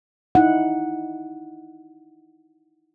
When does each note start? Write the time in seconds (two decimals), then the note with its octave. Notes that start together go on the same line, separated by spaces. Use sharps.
0.35 D#4 E4 F#5